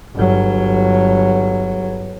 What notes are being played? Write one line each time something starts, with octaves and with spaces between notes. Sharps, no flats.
G1 F#3